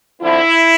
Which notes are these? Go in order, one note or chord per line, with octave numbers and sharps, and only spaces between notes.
D3 F3 C4 E4